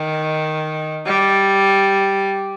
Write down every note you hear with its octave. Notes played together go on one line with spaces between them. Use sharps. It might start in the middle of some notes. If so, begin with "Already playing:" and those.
Already playing: D#3
G3